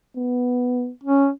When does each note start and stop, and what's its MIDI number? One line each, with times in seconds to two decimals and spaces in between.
0.17 0.90 59
1.04 1.29 61